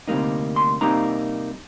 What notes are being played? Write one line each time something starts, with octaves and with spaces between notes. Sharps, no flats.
D2 C3 G3 A#3 D#4
C6
C3 G3 A#3 D#4 A#5